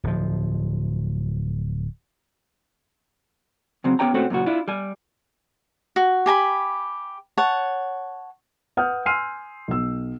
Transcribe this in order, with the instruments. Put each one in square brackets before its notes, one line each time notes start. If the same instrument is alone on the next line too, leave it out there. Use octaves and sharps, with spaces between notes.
[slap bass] D1 F3
[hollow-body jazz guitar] C#3 F#3 C4
B3 C#4 G4 C#5 G5 A#5
A#2 A3 C4 C#4 F#4
F#2 A#2 C#3 F#4
D4 E4 F4
G3 G#5
[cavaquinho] F#4
G4 G#5 A#5 B5
C#5 F#5 A5
[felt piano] B4 F#5 D#6 F6 G6
G#5 C6 E6 F6 C7 D#7
B1 E6